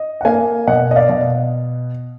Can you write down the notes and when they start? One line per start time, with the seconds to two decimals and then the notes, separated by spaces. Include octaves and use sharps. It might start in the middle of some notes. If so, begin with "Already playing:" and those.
Already playing: D#5
0.21 F#5
0.25 A#3 F5 G#5
0.67 B2 D#5 F#5
0.91 D#5
0.96 D5 F5
1.09 B2